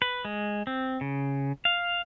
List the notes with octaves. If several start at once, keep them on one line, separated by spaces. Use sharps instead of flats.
B4
G#3
C4
C#3
F5